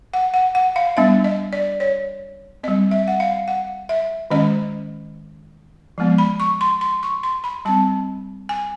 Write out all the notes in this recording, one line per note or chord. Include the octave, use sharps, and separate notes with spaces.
F#5
F#5
F#5
F5
G3 B3 D4 E5
D#5
D5
C#5
G3 C4 D#5
E5
F#5
F5
F#5
E5
D#3 G#3 C#4 D#5
F3 G#3 B3
B5
C#6
C6
C6
C#6
C6
B5
G3 C4 A5
G#5